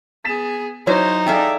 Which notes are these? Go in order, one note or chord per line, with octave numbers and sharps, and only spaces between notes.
B3 G#4 A6 B6 E7
F#3 D#4 E4 A#4 C5 C#5
G#4 A4 D5 E5 F5 G5 G#5